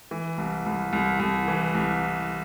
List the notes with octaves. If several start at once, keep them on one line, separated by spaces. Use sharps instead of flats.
E3
C2
C2
C2
C2
E3
C2